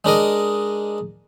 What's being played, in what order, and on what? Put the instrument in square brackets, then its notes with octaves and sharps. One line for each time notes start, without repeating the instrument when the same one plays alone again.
[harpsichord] G#3 D4 A#4 D#5